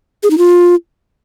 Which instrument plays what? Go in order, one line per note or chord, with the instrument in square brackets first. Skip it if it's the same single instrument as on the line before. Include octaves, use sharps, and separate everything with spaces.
[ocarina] G#4
D#4
F4